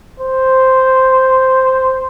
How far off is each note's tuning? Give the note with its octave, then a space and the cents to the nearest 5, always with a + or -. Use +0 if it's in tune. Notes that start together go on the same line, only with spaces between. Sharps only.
C5 -5